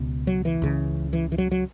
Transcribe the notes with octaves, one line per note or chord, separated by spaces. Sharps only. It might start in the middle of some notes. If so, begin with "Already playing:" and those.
Already playing: C#2 B2
F#3
E3
C#2 C#3
E3
E3
F#3
F#3